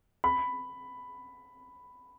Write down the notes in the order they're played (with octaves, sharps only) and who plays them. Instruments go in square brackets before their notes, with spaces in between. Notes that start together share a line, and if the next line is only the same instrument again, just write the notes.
[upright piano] B5